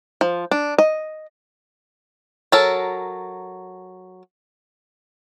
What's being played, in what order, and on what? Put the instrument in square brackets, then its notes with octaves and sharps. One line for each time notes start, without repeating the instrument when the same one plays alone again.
[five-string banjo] F3
D4
D#5
F#3 A4 A#4